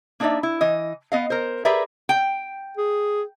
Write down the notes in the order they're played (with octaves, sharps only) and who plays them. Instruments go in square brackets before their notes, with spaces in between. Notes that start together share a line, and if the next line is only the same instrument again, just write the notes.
[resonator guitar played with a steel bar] A#3 D4 D#4 C5 D5 E5
E4
E3 D#5
B3 D#5 F5
A#4 C5
G4 G#4 A#4 B4 D5 E5
G5
[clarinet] G#4